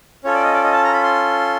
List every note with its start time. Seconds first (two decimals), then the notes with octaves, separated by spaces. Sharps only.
0.24 C#4 F4 A4 C#5
0.34 D5
0.44 D#5
0.54 D5
0.64 D#5
0.73 A5
0.84 A#5
0.93 B5
1.03 C6